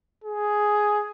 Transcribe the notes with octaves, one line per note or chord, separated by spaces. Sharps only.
G#4